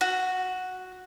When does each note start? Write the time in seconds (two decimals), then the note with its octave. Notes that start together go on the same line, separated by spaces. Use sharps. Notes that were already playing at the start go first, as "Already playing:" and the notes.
0.01 F#4